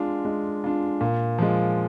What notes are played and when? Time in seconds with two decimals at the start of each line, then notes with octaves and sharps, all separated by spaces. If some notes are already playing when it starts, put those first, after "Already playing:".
Already playing: G#3 D4 F4
0.25 G#3
0.64 D4 F4
1.01 A#2
1.38 F3 G#3